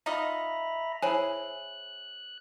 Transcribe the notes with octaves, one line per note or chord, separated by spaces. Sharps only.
D#4 F4 D#5 E5 A#5 B5
E4 G#4 C5 C#5 G#5 F#6